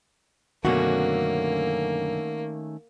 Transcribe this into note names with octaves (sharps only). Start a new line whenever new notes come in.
F#2 B2 D3 D#3 A3 A#3 C#4 F#4